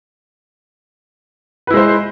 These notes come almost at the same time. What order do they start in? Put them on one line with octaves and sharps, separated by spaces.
B4 E4 G#3 C5